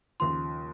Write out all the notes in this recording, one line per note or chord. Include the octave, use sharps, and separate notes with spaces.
D#2 C#3 F3 C6